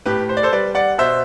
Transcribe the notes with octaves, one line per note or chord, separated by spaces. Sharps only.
A2 G4 B4
C5
D5
A4 C5
G3 B4 D5
D5 F#5
B2 C5 E5